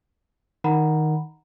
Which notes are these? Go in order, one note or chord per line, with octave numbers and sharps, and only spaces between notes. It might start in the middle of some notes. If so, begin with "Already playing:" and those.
D#3 F#5 A#5 B5